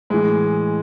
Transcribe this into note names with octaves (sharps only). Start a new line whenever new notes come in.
A2 E3 G#3